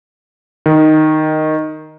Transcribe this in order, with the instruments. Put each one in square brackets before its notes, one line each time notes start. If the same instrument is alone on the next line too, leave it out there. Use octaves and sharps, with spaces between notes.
[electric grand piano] D#3